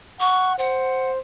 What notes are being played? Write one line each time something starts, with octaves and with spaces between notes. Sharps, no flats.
F#5 C#6
C5 F#5